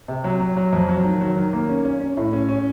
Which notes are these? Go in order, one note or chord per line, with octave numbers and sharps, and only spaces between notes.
C3
F#3
F#3
F#3
F2
F#3
D#3
F#3
D#3
A#3
C#4
C#4
C#4
A2
C#4
C#4